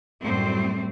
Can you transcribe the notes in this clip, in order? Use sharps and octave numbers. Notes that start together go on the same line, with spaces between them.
F#2 A2 F#3 G3 A3 C4